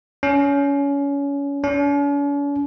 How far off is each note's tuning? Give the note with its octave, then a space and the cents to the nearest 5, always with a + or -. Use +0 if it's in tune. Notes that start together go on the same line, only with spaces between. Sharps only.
C#4 +25
C#4 +45